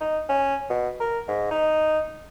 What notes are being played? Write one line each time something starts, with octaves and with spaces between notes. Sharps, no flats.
D#4
C#4
B2
A#4
G#2
D#4